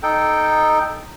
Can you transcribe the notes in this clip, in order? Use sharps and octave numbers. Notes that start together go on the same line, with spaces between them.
D#4 A4 G5